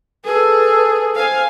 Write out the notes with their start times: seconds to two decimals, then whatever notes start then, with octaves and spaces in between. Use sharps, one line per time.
0.25 G#4 A4 B4
1.16 C5 F5 G#5